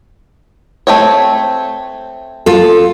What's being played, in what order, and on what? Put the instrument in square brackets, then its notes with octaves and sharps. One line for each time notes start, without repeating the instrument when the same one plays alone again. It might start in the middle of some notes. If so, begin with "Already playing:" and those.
[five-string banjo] A3 C4 C#5
[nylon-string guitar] F4 A4